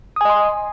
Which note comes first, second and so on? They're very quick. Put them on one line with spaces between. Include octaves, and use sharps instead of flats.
D#6 G#5 D#5 C6